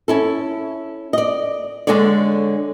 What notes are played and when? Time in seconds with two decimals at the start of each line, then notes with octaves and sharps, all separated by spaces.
0.08 C#4 E4 A4
1.13 D5 D#5
1.87 D3 G#3 A4 C#5 D5